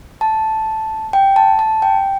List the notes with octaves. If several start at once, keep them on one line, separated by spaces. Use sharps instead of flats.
A5
G5
A5
A5
G5